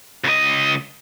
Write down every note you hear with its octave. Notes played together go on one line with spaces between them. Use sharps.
C#2 D#5